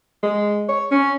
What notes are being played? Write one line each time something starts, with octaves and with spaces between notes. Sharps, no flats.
G#3
C#5
C#4